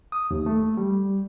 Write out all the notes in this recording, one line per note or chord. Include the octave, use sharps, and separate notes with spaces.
D#6
D#2
A3
G3